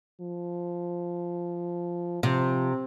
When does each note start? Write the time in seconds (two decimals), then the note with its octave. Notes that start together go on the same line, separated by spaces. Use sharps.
0.21 F3
2.23 C3 F3